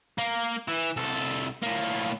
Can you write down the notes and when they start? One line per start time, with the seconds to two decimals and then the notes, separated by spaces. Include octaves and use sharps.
0.18 A#3
0.68 E3
0.97 C2 A4
1.62 A2 A#3